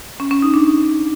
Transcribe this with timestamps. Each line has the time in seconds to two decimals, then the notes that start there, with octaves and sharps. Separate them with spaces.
0.20 C#4
0.31 C#4
0.42 D#4
0.54 D4